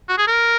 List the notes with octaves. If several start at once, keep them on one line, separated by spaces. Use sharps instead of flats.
F#4
G#4
A#4